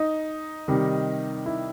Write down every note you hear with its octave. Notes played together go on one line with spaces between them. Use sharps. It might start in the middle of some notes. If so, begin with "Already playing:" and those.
Already playing: D#4
C3 D#3 G3
E4